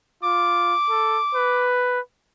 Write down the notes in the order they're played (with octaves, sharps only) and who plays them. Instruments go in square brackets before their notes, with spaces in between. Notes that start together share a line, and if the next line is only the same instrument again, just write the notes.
[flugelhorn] F4 [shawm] D6
[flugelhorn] A4
B4